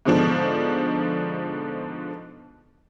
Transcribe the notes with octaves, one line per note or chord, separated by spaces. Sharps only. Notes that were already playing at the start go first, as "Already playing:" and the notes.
G#2 B2 D3 F3 D4